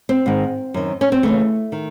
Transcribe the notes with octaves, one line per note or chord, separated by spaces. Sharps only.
C4
G#2 D#3
F#2 D#3
C#4
C4
D#2 C#3 E3 A3
D#3